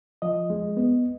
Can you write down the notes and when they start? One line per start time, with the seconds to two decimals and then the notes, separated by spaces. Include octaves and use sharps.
0.22 F3 D#5
0.50 G#3
0.77 B3